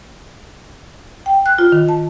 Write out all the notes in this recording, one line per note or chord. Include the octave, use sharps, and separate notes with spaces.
G5
F#6
F4
D#3
A5